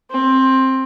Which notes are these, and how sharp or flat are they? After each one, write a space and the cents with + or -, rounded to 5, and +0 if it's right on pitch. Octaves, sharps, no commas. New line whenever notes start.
C4 +15